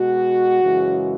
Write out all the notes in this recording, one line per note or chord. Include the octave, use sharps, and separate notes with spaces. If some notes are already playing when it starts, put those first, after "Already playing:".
Already playing: B2 G#3 F#4
F#2 C#3 E3 G#3